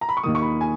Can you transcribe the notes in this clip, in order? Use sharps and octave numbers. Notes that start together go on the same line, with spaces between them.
A#5
B5
C#6
D#2 D#3 A#3 D#6
C#6
B5
G#5